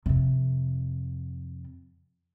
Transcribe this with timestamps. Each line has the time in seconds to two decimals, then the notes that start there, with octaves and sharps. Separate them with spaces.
0.06 F2 C3